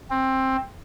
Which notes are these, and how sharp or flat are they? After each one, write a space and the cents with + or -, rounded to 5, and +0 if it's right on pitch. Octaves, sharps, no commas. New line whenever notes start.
C4 +15